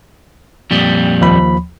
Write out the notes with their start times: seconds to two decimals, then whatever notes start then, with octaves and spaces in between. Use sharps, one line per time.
0.71 F2 A#2 G3
1.21 D#2 F3 B5